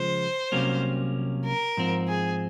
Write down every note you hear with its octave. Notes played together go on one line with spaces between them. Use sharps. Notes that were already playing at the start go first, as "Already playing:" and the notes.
Already playing: C#2 C#3 F3 G#3 C5
C2 C3 F#3 A#3 C#4
A#4
G#2 F3 C4
G#4